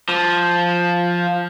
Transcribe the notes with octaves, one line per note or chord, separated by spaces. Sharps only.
F3